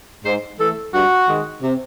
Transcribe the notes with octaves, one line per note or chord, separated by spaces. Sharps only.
G#2 C5
E3 A3 A4
G2 F#4
D#3 G#3
C3